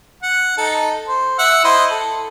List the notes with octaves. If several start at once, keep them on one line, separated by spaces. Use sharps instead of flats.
F#5
D#4 A4
C5
E5 F#5 E6
E4 C5 D#5
A4